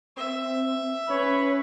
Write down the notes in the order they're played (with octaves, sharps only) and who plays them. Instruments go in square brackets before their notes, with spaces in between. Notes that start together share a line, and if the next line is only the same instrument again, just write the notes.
[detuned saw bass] C4 [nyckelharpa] E5
[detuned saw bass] C#4 [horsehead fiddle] B4 B5 [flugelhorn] C#5